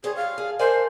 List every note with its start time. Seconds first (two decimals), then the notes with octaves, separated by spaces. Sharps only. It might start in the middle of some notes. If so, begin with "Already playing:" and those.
0.04 G3 G#4 C5 C#5
0.16 F5
0.38 G#4
0.59 A#4 C5 D5 G#5